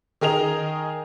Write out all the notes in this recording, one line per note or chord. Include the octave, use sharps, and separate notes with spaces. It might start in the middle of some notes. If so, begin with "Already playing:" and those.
D#3 G#4 A#4 D#5 F7